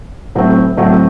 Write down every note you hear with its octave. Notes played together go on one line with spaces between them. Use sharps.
A2 F#3 A3 C4
A2 F#3 A3 C4